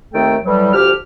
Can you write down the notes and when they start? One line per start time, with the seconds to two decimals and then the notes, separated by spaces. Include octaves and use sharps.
0.14 D#2 D#3 A3 C4 A4 G5
0.45 A2 E3 F#3 G3
0.73 D2 F3 G4 F6